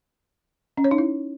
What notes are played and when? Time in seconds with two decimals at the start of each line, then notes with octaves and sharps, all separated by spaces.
0.77 C#4
0.84 C#5
0.91 D#4
0.98 E4